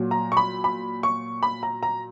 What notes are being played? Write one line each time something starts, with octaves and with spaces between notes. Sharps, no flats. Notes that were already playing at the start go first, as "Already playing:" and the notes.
Already playing: A#2 F#3
A#5
C#6
B5
B5
C#6
B5
A#5
A#5